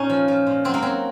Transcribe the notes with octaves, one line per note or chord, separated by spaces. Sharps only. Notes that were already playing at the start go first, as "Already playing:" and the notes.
Already playing: A#2 C#4 D#4
F3
F3
A#2
F#3 C4
A#3
F#3 C4